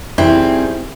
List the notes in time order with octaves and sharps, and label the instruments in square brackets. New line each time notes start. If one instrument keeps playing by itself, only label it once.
[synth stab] F2 E3 [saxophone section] D#3 G3 G#4 [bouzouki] C4 [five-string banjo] E4